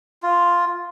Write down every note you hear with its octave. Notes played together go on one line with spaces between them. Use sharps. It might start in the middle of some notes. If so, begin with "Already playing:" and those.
F4